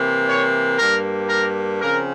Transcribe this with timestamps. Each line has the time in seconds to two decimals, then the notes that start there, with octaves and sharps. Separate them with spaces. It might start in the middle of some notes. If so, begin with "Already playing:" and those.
Already playing: C3 E3 A#3
0.27 C#5
0.78 G2 G3 A#3 A#4
1.29 A#4
1.81 C#3 F3 C4 A#4